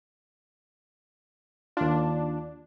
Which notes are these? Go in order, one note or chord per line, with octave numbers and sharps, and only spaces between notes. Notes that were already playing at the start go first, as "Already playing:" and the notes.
D#2 D4 F4